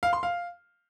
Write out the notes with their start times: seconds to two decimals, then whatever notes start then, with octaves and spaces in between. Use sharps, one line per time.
0.03 F5
0.13 C6
0.23 F5